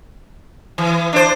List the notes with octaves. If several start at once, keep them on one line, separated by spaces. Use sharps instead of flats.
E3
D4 C5